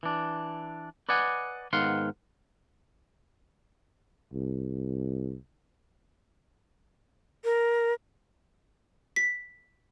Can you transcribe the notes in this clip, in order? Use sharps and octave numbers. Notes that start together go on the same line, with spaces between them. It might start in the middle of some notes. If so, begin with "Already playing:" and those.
E3 D4
B4 D5 D#5 F#5 G#5
G#2 D#3 B3 F5 F#5 C6
C2
A#4
B6